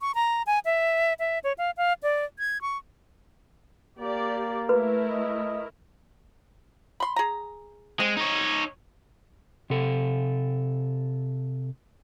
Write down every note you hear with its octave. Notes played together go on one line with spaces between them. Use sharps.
C#6
A#5
G#5
E5
E5
C#5
F5
F5
D5
G#6
C#6
A#3 G4 D5
A3 E4 A#4 B4
D#5
B5 C6
G#4 A#5
G#3 C4
D#4 C#5
C3 A4